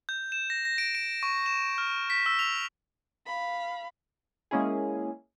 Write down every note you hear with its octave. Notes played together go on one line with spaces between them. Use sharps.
G6
E7
A#6
A#6
D7
D7
C#6
E7
F6
B6
E6
F7
F5 B5
G#3 A#3 C#4 E4 G#4